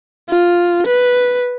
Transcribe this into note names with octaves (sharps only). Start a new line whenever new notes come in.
F4
B4